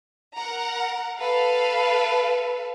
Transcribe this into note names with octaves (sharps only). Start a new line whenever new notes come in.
A#4 F#5 A#5
A4 B4 F5